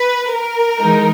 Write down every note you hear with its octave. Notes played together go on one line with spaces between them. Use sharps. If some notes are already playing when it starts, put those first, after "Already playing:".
Already playing: B4
A#4
E3 G#3 D#4